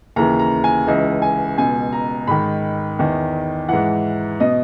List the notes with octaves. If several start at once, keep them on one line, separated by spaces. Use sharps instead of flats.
D#2 C#3 E3 A#5
A#5
G#5
C#2 C#3 E3 D#5
G#5
C#2 B2 G#5
A#5
G#2 D#3 B5
E2 D#3
G#2 E3 F#5
B2 D#5